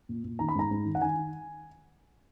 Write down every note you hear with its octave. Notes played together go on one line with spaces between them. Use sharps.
A#2
A#2
D#3 A#5
B5
G#2 A#5
G#2
D#3
F#5
D#3 G#5
D#3